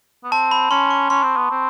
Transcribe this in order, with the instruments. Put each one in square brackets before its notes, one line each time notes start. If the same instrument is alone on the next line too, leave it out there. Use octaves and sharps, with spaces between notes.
[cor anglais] B3
[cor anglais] C4 [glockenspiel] A5
[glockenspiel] B5
[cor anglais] C#4 [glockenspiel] C6
[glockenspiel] C#6
[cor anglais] C#4 [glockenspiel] C6
[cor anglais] C4
B3
C4